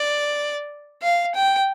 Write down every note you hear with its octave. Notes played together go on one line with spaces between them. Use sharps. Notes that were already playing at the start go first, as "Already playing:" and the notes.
Already playing: D5
F5
G5